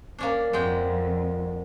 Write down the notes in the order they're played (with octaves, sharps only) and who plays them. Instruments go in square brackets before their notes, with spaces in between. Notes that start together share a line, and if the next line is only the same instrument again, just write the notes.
[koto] A#3 C#4 D4
[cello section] F2 [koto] G#3 F#4 G5